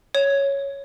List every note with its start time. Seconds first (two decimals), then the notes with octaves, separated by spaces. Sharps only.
0.15 C#5